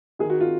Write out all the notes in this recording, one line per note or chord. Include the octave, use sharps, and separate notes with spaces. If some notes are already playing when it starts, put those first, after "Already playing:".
D#3 G#4
F#4
F4